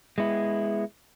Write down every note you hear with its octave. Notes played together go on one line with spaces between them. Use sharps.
G#3 B3 E4